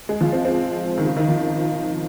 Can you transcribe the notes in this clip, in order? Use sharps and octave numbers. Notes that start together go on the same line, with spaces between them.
G#3
F3
C4
C4
D#3
C#3
D#3
F3